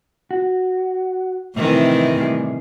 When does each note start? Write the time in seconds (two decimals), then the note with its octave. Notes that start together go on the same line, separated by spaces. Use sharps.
0.31 F#4
1.56 F2 A2 C3 D#3 E3
2.16 A2 G3 G#4